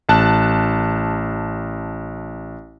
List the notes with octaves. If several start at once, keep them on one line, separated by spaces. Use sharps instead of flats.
A1 A5 F#6